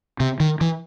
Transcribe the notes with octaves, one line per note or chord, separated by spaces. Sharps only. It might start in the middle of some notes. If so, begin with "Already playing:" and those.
C3
D#3
E3